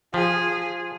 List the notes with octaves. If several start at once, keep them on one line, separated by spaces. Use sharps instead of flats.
F3 F4 G#4